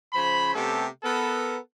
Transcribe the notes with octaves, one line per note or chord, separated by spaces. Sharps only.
C#3 F3 C5 B5
C3 A3 B3 C#4 G4 A4
B3 A4 A#4